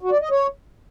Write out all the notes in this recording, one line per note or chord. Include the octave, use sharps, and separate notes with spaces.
F#4
D5
D#5
C#5